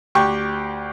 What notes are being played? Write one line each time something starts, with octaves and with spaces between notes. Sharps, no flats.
D2 G4 G5 C#6